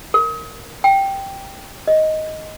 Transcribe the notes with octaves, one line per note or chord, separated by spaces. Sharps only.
A#4
G5
D#5